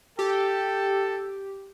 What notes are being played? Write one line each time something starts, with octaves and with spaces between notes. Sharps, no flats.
G4 A4 G5